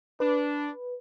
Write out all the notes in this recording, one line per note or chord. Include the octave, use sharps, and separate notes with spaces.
D4 B4